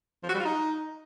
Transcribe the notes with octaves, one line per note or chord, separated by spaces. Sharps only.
F3
F#4
G3
F4
D#4